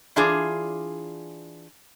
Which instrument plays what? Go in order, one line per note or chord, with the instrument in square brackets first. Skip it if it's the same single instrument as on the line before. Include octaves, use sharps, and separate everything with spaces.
[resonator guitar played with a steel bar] E3 D4 F4 G#4